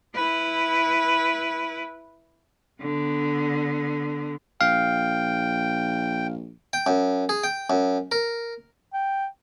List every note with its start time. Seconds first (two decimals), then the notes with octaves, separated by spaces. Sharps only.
0.15 E4 B4
2.81 D3 B3
4.61 A#1 F5 G5
6.73 G5
6.86 F#2
7.29 G#4
7.44 G5
7.70 F#2
8.12 A#4
8.93 G5